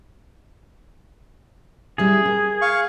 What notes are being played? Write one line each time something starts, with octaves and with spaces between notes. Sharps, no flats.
G3 C#4 E4 G#4
A#4
F5 C#6